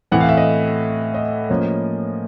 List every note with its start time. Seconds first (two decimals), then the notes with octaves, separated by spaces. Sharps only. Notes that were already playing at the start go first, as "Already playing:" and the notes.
0.12 A2 E3 A3 C4 F#5
0.20 F5
0.29 E5
0.37 D#5
1.14 D#5
1.49 A2 F3 A#3 C#4